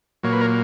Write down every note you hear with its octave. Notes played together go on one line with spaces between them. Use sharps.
A#2 F#3 A#3 C#5
B4
A#4 C#5